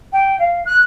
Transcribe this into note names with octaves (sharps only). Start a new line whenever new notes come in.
G5
F5
F#6